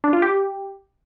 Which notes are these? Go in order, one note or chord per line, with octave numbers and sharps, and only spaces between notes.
D4
F4
G4